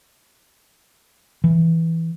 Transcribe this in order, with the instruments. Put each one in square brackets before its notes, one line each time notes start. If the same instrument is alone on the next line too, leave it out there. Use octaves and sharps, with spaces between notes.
[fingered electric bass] E3